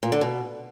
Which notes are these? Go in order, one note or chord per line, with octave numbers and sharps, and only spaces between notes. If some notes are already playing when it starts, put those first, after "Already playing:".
A#2
D3
B2